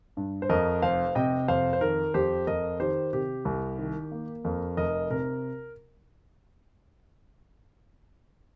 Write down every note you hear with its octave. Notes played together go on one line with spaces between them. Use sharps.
G2
C5
F2 A#4 D#5
F1 C5 F5
C3 D#5 G5
F2 C5 F5
C5
D#3 A#4
F2 G4 C5
F2 A#4 D#5
D#3 G4 C5
C3 G4
C2
D#3
A#3
F2 A#4
F1 A#4 D#5
C3 A#4